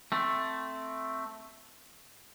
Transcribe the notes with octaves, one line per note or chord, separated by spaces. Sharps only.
A3 C4